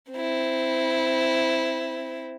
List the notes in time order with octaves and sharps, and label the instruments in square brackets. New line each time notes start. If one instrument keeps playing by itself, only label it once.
[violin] C4 E4